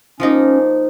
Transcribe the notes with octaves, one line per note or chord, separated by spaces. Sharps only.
F3 A#3 C#4 D#4